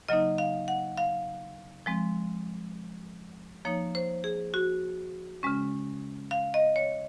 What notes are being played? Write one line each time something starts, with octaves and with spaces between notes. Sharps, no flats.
C#3 F#3 A#3 D#4 D#5
F5
F#5
F5
F3 G#3 C4
F3 A#3 D#4 C#5
C5
G#4
F#4
C#3 G#3 C#4
F5
D#5
C#5